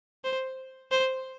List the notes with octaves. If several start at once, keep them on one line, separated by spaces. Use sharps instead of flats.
C5
C5